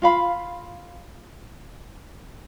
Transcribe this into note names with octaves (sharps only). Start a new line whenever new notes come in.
F4 F5 B5